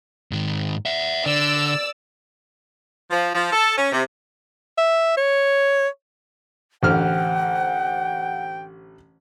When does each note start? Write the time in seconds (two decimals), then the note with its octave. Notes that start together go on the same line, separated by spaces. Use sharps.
0.32 G#2 D#3
0.86 E5 F#5
1.26 D3 D5 E6
3.10 F3
3.35 F3
3.53 A4
3.76 C#4
3.92 C3
4.78 E5
5.17 C#5
6.83 A1 D3 E3 C5 F#5 G5 F6